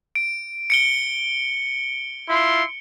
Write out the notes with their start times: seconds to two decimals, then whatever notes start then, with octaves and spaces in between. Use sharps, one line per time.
0.15 D7
0.70 C#7 D7 G7
2.29 E4 F4 C6